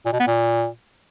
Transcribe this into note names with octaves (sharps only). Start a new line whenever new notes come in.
A#2
B2
B3
A#2